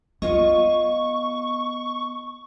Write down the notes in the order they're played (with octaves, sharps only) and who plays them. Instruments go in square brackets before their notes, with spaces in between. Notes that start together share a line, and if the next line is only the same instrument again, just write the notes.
[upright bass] B3 [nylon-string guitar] F4 C#5 D#5 [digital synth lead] C#6